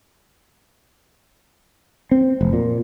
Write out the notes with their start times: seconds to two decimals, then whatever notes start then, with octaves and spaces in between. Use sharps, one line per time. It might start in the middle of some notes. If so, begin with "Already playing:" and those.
2.11 C4
2.41 F1
2.53 A#2